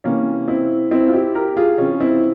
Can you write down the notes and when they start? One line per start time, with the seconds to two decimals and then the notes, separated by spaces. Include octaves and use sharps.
0.04 C3 E3 A#3 C#4
0.48 C4 E4
0.91 C4 E4
1.08 F4
1.13 E4 G4
1.35 G4 A#4
1.57 F4 G#4
1.78 C3 E3 C#4 F4
2.00 C4 E4